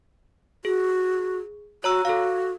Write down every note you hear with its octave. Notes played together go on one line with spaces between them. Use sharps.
F#4 G#4
F#4 C#5 A#5 E6
F#4 A4 F5